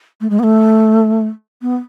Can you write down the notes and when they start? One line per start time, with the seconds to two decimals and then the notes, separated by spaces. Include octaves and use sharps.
0.21 A3
0.30 G#3
0.39 B3
0.43 A3
1.62 B3